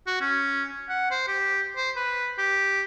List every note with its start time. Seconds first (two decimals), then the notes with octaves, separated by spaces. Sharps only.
0.07 F#4
0.21 C#4
0.89 F#5
1.11 C5
1.28 G4
1.76 C5
1.96 B4
2.38 G4